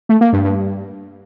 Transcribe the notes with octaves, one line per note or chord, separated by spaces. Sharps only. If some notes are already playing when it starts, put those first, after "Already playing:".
A3
A#3
G2
G2